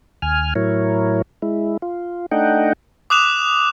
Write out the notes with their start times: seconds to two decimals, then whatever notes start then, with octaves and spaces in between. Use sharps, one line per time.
0.22 D#2 G#5 F6
0.55 A2 F#3 E4 A#4 C#5
1.42 G#3 E4
1.82 F4
2.31 A3 D4 D#4 D#5 F#5 G5
3.10 D6 D#6 F#6 E7 F7